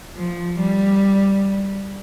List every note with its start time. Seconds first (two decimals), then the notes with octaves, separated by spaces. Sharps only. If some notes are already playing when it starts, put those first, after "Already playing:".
0.15 F3
0.59 G3